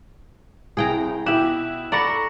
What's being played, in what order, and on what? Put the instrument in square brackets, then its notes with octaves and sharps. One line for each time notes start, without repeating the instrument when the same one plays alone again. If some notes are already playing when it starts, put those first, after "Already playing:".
[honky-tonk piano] C2 [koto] G#4 G5 A#5
[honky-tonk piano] B2 E4 F#4 [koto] G4 [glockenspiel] F#6 E7 F#7
[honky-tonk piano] A4 B5 C#7 [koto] D5 F#5 [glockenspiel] A#5 C#6 A#6